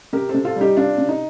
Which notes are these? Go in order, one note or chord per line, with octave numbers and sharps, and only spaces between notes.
C3 G4 A#4
A4 C5
C3
F4 A4
G3
D#4 G4
C3 D4 F4
C3
D#4